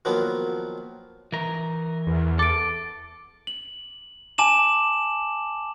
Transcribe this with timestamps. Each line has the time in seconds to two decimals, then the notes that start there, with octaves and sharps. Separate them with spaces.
0.05 D#3 F3 F#3 A#3 B3
1.32 E3 A#4
2.07 E2
2.39 A4 D6 D7
3.47 F#7
4.38 G#5 A5 D6 E7 F#7